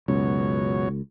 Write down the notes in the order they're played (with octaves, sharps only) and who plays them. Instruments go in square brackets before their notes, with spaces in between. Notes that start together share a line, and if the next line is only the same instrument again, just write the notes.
[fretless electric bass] C#2 [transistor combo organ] F#2 B2 C#5